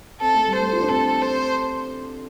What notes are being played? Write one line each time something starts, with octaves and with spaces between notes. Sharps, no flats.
C4 A4
A3
G3
A3 C5
F4
D4
C4 A4
C5